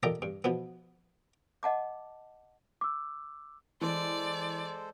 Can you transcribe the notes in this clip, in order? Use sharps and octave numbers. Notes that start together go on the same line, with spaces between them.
F4 G4 A4 A#4 D5 D#5
G2
B2 F3 B3
D#5 F#5 A5 D6
D6 E6
E3 G#3 A4 C5 D5